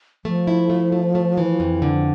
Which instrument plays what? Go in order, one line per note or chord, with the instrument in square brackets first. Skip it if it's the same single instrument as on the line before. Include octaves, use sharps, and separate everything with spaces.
[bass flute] F3 [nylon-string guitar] A3
[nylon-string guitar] E4
A3
A3
A3
E3
F2
D3